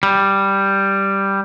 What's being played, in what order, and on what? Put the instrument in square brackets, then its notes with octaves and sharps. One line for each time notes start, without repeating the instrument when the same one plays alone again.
[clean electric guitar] G3